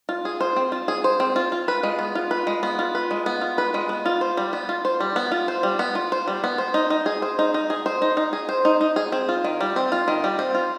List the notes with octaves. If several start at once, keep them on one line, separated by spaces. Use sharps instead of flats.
F4
G#4
C5
C4
F4
G#4
C5
C4
F4
F4
B4
G#3
B3
F4
B4
G#3
B3
F4
B4
G#3
B3
F4
B4
G#3
B3
F4
C5
G3
B3
F4
C5
G3
B3
F4
C5
G3
B3
F4
C5
G3
B3
C5
D#4
D#4
G#4
C5
D#4
D#4
G#4
C5
D#4
D#4
G#4
C5
D#4
D#4
G#4
C4
F4
D#3
G3
C4
F4
D#3
G3
C4
F4